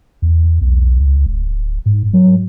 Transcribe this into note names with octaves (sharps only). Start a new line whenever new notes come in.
E2
B1
C#2
D1
G#2
F#3